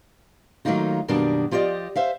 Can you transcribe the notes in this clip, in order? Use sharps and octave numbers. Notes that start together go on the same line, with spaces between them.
D#3 F#3 A3 A#3 D#4 F4
F#2 B2 D#3 G3 A#3 D4
F3 F4 G4 D5 D#5
C5 E5 F5